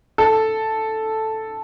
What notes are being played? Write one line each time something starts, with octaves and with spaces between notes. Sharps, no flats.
A4